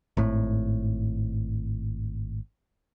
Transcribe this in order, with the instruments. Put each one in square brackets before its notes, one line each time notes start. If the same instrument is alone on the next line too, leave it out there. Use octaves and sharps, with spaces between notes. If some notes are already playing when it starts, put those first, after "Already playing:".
[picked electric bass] G#1 A2